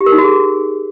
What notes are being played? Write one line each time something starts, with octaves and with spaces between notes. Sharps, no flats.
G4
A#4
D#4
F#4
G#4